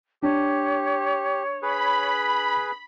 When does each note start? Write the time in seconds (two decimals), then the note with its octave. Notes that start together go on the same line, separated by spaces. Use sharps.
0.23 D4 G4 C#5
1.62 G#4 B4 B5